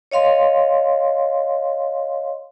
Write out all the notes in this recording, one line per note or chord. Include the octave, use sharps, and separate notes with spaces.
C#5 D#5 F5 C6